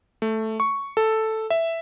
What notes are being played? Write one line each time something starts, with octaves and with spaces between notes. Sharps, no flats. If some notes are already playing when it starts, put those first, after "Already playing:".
A3
C#6
A4
E5